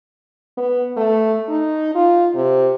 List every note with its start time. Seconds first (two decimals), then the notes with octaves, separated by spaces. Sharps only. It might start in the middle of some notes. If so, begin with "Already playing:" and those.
0.57 B3
0.97 A3
1.49 D#4
1.95 F4
2.35 C3